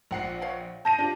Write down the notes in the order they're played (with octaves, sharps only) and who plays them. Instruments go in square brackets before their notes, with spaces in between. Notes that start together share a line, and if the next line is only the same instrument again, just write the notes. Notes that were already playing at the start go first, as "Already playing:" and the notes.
[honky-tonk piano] A#1 F#5 C7
[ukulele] C#5 F5 G5
[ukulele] A5 [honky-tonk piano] G6 A#6 D#7
[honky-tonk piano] D4 F4 [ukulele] G4